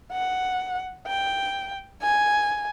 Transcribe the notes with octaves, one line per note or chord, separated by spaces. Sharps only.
F#5
G5
G#5